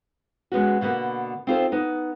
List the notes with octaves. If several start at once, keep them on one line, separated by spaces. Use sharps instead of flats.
G#3 B3 C#4 F#4
B2 D3 A#3 B3
C4 D#4 F4 G#4 A4 C5
B3 D#4